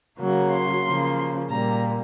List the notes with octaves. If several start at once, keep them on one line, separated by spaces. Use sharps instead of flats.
C#3 F#3 A#3
C6
C#3 F3 A#3
A#2 G3 A#3 A#5